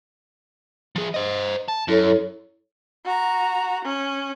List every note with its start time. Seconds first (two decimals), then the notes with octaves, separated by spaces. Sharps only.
0.96 F3 G#4
1.14 C5 D#5
1.68 A5
1.88 F#2 E4 A4 C#5
3.05 F#4 A#5
3.85 C#4